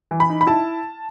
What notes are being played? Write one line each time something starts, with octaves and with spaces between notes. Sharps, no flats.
E3
B5
D#4
B5
E4 A5